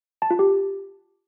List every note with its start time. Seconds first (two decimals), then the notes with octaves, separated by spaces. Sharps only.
0.22 A5
0.31 F4
0.39 G4